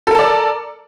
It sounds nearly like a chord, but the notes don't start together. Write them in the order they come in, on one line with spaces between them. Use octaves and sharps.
A4 A#4 A5 D5